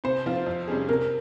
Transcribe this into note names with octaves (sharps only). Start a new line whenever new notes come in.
C3 C5
F3 C4 F4
F2
C3 G3 C#4 G#4
C3 A#4